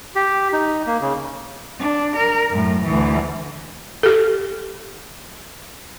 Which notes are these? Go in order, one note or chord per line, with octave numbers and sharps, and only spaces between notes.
G4
D#4
A#3
C#3
D4
A#4
F#2 A2
D2 E3
G4 A4